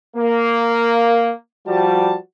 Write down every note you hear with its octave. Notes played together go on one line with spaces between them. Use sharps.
A#3
F3 G3 F#4 A5